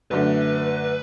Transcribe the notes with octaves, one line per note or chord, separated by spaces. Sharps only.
F#2 D3 A3 B4